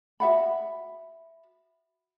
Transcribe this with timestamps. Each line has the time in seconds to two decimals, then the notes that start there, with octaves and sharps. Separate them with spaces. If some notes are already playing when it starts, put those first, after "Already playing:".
0.20 F#4 E5 F#5 B5